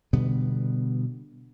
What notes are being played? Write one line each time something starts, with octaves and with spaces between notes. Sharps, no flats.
B2 D3 G3 B3